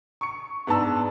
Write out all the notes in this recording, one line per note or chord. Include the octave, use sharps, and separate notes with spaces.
C#6 C#7
G#2 B3 D4 A5 E6